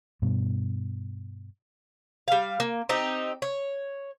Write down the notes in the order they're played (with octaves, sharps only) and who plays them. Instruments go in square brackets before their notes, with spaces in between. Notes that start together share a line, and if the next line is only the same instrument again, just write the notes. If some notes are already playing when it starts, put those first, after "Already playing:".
[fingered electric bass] G2 B2
[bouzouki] G3 F5
A#3
C4 D#4 G4
C#5